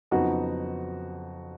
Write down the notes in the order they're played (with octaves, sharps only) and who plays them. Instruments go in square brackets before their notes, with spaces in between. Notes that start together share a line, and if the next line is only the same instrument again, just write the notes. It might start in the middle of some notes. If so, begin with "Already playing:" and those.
[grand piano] F2 C#3 F#3 B3 D#4 F#4